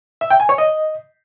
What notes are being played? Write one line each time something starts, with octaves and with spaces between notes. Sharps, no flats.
E5
G5
G#5
C#5
D#5